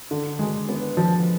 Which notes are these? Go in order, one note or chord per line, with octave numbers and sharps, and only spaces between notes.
D3
G#3
B3
F3